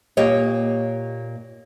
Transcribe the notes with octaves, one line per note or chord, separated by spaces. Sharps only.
A#2 A#3 G4 C#5 D#5